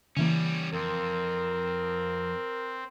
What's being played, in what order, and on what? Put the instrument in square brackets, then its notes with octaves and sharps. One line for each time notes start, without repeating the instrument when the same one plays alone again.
[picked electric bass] C#3 E3 A#3 [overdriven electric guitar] G3 C#4
[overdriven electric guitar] F2 [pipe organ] C4 [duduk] A#4